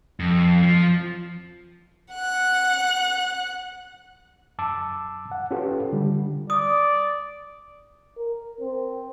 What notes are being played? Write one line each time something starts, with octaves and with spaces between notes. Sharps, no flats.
F2
F3
F#5 F#6
F#2 A5 D6 E6
F#5
C#4 F4 G4 A4 B4
D3 G3
D5 D#6
A#4
C4